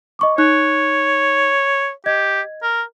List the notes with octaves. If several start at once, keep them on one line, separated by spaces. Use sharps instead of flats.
D#5 C#6 D6
D#4 C#5 F#6
G4 D#5 G#6
A#4